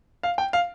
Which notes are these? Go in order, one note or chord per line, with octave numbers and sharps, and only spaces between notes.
F5
G5
F5